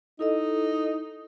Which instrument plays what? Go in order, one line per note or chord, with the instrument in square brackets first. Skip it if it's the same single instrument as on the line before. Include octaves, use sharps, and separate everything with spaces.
[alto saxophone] D#4 [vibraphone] E4 A4 D#5